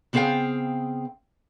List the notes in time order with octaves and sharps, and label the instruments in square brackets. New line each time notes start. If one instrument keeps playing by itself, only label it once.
[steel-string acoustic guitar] C#3 B3 C4 G#4 F5 G5